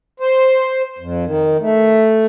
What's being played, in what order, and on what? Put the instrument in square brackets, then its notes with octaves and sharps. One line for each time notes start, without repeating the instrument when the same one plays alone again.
[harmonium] C5
F2
D#3
A3